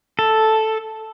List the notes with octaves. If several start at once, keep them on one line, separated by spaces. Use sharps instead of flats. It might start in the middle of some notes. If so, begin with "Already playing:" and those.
A4